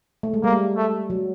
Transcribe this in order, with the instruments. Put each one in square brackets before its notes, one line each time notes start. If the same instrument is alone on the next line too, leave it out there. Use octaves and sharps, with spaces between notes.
[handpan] A3
G#3
[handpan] G3 [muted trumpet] A#3
[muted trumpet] A3
[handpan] F#3